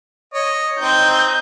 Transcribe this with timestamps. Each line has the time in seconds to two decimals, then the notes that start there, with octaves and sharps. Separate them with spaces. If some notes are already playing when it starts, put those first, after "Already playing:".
0.34 C#5 D#5
0.79 C4 D#4 G6